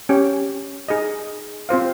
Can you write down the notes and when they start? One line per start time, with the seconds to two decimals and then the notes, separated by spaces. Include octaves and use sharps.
0.09 C#4 G4 C#5
0.89 D#4 G#4 D#5
1.69 C4 F4 C5 F5